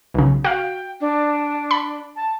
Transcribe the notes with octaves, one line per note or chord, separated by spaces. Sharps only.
B1 C#3
F#4 F5 G5
D4
B5
A5